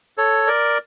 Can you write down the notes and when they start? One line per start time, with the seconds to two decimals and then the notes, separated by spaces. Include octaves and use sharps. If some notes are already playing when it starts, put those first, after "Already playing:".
0.18 A4 C#5
0.47 A#4 D5